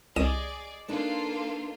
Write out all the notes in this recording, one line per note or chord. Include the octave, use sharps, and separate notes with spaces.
C2 G#4 D5 D#5 D#7 E7
A#3 D4 D#4 F4 A4 B4